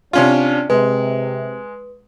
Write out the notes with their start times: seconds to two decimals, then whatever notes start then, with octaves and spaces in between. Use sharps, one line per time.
0.13 C3 C#4 D4 F4
0.70 C3 G#3 B4